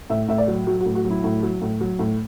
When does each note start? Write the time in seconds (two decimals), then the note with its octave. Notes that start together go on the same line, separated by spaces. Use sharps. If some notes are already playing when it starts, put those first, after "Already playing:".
0.10 A2 E5
0.28 A2 E5
0.38 D5
0.48 F#3
0.67 F#3 F#4
0.81 F#4
0.86 A2
0.95 F#4
1.05 F#3
1.10 E4
1.24 A2
1.43 F#3
1.61 A2
1.81 F#3
1.99 A2